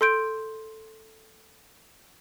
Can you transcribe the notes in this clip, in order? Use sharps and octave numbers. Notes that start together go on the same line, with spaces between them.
A4 C6 G6 D7